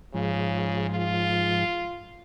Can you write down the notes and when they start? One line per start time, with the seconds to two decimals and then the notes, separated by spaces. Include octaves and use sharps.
0.14 G#2 C#3 F3
0.90 F4